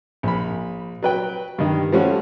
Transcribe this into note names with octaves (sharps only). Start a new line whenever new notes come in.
A#1 B5
F#3 B4 G5
G2 D#3
F3 G3 A3 C#4 F#4